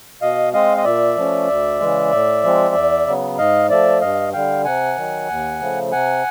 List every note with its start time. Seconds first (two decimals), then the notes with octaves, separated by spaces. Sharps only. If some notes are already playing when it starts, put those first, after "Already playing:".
0.22 B2 D#5 F5
0.53 G#3 C4 D#5 F5
0.77 D#5
0.84 A#2 D5 E5
1.16 F3 A3 C#4
1.48 D2
1.80 C#3 E3 G#3
2.12 A2
2.44 F3 G#3 C4
2.75 E2
3.07 C#3 F#3 B3
3.38 G#2 D#5 F5
3.70 F3 A3 D5 E5
4.01 G2 D#5 F5
4.33 D3 G3 F5 G5
4.65 C3 F#5 G#5
4.96 D#3 F#3
5.29 D#2
5.60 C#3 F3 A3
5.91 C3 F#5 G#5